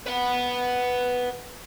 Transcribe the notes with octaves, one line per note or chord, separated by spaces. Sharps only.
B4 F#5